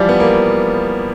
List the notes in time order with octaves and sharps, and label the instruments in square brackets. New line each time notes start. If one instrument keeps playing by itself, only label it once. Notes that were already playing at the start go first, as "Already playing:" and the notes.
Already playing: [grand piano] E3 F3 G3 [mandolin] D5
[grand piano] B3
A#3